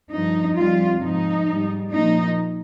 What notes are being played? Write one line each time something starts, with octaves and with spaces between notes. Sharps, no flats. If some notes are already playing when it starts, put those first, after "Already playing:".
G2 F3 D#4
F2 C3 G3 F4
G#2 F3 D#4
G#2 G3
A#2 F3 D#4